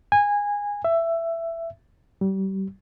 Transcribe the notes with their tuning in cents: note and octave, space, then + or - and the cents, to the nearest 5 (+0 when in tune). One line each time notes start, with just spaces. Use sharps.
G#5 -20
E5 +15
G3 -30